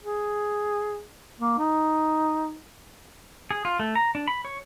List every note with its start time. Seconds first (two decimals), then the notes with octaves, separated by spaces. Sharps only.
0.02 G#4
1.40 A#3
1.58 D#4
3.51 G#4
3.65 F4
3.79 A3
3.95 A#5
4.15 D4
4.28 B5
4.45 C#5